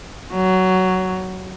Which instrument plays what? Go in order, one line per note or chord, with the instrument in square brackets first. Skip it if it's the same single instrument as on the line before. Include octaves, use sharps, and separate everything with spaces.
[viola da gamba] F#3